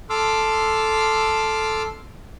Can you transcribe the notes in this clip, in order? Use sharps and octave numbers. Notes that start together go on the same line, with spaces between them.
A4 C6 D6 E6 F6